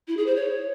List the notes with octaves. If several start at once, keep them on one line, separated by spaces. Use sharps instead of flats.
E4
G#4
C5
C#5